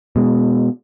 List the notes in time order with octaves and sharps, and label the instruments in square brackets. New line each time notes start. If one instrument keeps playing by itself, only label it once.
[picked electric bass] B2 G#3